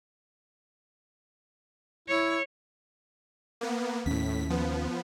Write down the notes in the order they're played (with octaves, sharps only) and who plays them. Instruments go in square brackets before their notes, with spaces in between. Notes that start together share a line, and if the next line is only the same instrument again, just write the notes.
[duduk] E4 [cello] C#5
[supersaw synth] A#3 B3
[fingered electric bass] D#2 C#4 [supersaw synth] A2 B6
[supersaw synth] F3 B3